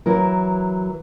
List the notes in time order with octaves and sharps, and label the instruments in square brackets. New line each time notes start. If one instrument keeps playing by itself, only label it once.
[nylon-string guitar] E3 F#3 E4 A#4